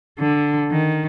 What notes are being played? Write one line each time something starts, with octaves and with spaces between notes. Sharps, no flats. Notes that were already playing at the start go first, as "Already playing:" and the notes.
D3
D#3